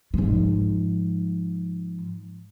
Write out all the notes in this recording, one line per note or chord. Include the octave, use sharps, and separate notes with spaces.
G#2 F3